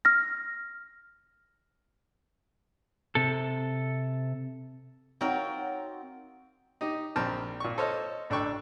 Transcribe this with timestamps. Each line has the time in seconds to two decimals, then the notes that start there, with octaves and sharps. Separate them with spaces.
0.05 F6 A#6
3.15 C3 A4
5.21 F#3 C4 D#4 F4 A#4 F#5
6.81 D#4 G4 D#5
7.16 A#1 C4 G5 A5 A#5 F6
7.60 A#2 C#6
7.78 A4 C5 C#5 D#5 F6
8.30 A1 D4 A4 G5 C#6 E6